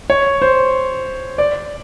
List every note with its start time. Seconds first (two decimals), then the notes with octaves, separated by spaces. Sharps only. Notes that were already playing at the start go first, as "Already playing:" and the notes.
0.10 C#5
0.42 C5
1.38 D5